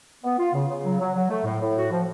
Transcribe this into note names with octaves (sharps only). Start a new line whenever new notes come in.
B3
F4
C#3
C#3
F#3
F#3
F#3
A3
A2
A2
F#4
F3